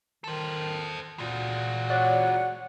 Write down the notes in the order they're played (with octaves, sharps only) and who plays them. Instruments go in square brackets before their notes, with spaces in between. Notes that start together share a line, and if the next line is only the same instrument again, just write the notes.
[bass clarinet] D#3 [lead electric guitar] A4 C5
[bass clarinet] A#2 [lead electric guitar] G#3 F#4
[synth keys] C#5 D5 F#6 [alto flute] F#5